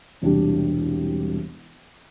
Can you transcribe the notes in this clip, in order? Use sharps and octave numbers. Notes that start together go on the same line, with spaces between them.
E1 C2 D4 G4